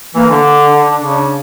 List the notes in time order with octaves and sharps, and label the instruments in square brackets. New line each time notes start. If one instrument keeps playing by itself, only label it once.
[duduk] E3 [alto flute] A#3
[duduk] D3 [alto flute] D4
[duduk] C#3